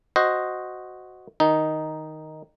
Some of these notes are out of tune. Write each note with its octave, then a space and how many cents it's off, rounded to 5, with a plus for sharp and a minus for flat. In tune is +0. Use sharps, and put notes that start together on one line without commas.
F#4 +0 C5 -5 D#5 +0
D#3 +0 D#4 +0